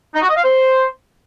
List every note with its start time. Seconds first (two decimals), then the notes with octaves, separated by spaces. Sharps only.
0.15 D#4
0.22 F#4
0.30 D#5
0.37 F5
0.44 C5